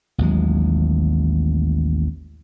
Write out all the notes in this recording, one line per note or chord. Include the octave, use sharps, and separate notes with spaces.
A1 D#2 F#3 G#3